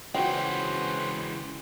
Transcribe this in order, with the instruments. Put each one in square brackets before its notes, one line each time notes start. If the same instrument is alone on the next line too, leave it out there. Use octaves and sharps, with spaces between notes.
[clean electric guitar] C#3 [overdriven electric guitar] E3 G#3 [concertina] C#4 B4 C5 [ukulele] F#4 G5